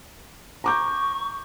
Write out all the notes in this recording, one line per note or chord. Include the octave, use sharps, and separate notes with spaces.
A#5 C#6 D6 G6